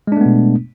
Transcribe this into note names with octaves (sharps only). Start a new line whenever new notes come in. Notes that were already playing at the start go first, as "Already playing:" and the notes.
B2 G#3 A3 B3 D4